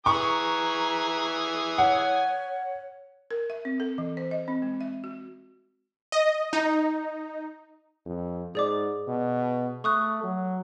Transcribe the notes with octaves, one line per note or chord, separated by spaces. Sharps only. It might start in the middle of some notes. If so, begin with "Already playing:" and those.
E3 G#5 A#5 C#6 D#6
C#5 F#5
A#4
E5
C4
A4
E3
C5
D#5
C4
G#3
E5
F#4
D#5
D#4
F2
G#2 G#4 D5 D6
B2
A3 C#6 D#6 F#6
F#3